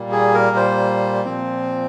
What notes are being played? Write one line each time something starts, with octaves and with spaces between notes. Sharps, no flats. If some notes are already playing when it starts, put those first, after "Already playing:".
Already playing: A#2 G3 A#3
G#4
A#4
C5
A#2 F3 C4